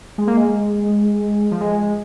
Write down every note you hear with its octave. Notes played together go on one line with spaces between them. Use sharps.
G#3
A#3
G#3
F3
G#3